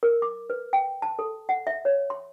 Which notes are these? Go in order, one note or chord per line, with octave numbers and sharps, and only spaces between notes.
A#4
D6
B4
G5
A5
A4
F#5
E5
C#5
C6